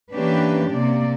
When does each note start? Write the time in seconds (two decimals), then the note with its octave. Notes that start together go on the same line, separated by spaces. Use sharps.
0.11 E3 A#3 C#4 D4 G4 B4
0.70 C3 A#3 D5